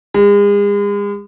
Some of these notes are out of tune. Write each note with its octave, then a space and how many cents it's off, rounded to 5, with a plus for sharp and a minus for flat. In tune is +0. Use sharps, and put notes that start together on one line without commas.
G#3 -40